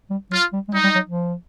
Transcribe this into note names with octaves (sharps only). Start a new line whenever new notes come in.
G3
F#3 F4
G3
G#3
G3 D#4
G3
F#3
F3